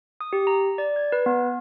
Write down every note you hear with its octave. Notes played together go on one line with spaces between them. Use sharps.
D#6
G4
A#5
D5
G#6
B4
B3